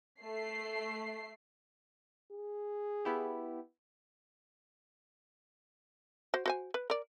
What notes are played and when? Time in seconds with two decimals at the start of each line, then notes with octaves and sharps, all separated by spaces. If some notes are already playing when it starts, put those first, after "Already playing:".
0.20 A3 C7
2.31 G#4
3.05 B3 E4 G4
6.34 F#4 C5
6.46 F#4 C5 G#5
6.74 B4
6.90 A#4 D5